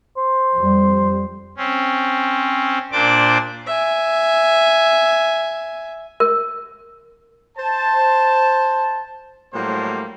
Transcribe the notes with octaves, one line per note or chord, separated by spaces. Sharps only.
C5
F2 G3
C4 C#4
A#2 D4 C5 D5 D6
E5 G#5
A#4
C5 A5
A2 F#3 G3 A#3 C5